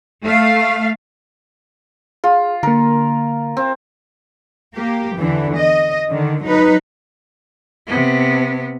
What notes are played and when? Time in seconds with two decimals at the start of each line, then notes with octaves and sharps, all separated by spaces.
0.24 A3 F5
2.24 F4 G#4
2.63 D3 A#3 A#4
3.57 C4
4.75 A#3 G4
5.17 E2 D3 E3
5.55 D#5
6.09 D3 D#3
6.44 F#3 D#4 B4
7.87 C3 B3